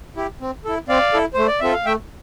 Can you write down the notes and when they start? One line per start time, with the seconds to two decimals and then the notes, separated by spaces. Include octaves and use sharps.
0.16 E4 G4
0.41 C4
0.65 E4 A4
0.88 C4 D5 F5
1.13 E4 A4
1.34 A3 C5
1.47 D5
1.60 C4 F4 A4 E5
1.73 F5
1.85 A3 E5 G5